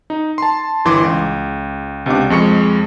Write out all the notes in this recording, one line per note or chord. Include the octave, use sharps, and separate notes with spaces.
D#4
A5 C6
G1 E3 C6 D6
C#2
C#2 C3 B3 D4 D6
F2 G#3 C#6 C#7